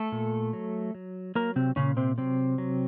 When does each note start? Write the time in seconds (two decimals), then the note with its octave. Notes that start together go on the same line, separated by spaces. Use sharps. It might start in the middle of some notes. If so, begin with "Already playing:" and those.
Already playing: A3 A4
0.12 A#2
0.53 F#3
0.94 F#3
1.35 F#3 A#3 A#4
1.56 C3 C4
1.76 A#2 C#3 C#4
1.97 C3 C4
2.18 C3 F#3 C4
2.58 F#3